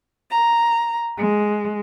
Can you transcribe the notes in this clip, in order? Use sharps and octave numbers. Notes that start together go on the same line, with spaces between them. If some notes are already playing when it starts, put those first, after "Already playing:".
A#5
G#3